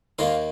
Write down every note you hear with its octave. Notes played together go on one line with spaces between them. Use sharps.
D#2 D#3 A#3 F4 F5